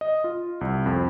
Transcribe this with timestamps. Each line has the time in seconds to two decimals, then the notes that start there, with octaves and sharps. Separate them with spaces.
0.01 D#5
0.24 F4
0.61 C2
0.86 F2